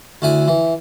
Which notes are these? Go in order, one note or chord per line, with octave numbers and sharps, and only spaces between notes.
D2 E4 G#5
E3